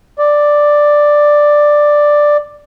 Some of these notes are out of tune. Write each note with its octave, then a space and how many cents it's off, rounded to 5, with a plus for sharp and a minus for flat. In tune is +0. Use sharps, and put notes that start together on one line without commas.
D5 +5